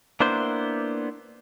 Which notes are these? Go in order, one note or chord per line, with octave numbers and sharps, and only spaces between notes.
A#3 B3 D4 E4 C5